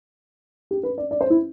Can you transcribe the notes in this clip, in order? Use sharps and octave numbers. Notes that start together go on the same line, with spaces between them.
G4
B4
D5
D5
C5
E4